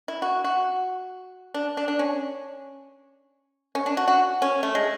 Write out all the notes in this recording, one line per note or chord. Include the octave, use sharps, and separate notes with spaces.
E4
F#4
F#4
D4
D4
D4
C#4
C#4
D4
F#4
F#4
C#4
A3
G#3